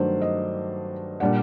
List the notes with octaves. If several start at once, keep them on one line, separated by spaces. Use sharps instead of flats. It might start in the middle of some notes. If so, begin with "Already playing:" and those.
Already playing: G2 D#3 F#3 A3 D4 C5 D5
D#5
A#2 G3 D4 F#5